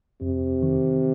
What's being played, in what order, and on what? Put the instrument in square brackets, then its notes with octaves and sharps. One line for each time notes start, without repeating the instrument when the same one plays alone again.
[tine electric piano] F2 [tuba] C3
[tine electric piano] D#3